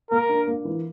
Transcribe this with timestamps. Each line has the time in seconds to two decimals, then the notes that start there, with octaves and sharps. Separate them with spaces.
0.10 A#3 A#4
0.29 D4
0.47 A#3
0.65 E3